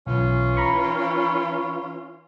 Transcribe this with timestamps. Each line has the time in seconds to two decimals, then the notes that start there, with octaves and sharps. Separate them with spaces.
0.06 B1 E3 C#4 F4
0.57 A#5 B5 C#6